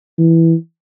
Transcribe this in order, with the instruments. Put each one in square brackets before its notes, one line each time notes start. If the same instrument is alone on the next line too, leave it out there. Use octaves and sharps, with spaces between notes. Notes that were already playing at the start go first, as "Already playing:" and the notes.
[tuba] E3